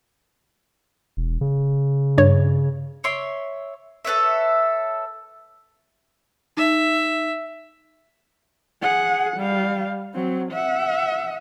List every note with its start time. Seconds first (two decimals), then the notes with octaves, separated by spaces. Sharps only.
1.17 E1
1.41 C#3
2.18 G2 C#5
3.04 C#5 E5 C6 D6
4.05 A4 B4 C#5 E5
6.57 D#4 E5
8.83 G#4 F#5
9.37 G3 F5
10.14 F#3 C4
10.52 E5 F#5